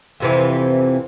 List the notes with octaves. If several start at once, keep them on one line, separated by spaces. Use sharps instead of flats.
F2 C3 E3